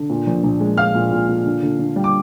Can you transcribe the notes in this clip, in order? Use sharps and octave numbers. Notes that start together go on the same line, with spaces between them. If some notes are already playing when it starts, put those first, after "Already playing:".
Already playing: D3
A#2
A#1
A#1
G#3
G#3 F5 F6
A#2
A#2
A#2
D3
D3
D3
G3
D6